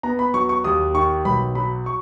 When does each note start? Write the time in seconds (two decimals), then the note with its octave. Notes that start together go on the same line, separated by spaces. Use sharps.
0.03 B3 A#5
0.19 B5
0.34 F#3 C#6
0.49 C#6
0.64 D#2 D#6
0.95 D#3 C#6
1.25 B1 B5
1.55 F#3 B5
1.86 C#6